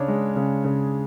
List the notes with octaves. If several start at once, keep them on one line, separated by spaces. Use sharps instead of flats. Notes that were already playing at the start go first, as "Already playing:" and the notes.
Already playing: C#3 D4 C#5
G#3
C#3
C#3